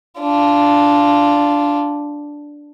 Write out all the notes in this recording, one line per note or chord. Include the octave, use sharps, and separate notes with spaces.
D4 F4